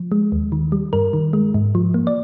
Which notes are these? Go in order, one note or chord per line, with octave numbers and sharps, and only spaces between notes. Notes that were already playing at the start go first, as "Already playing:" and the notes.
Already playing: F3
G#3
D#2
D#3
G3
G2 A#4
D#3
G#3
G#2
F3
A#3
D5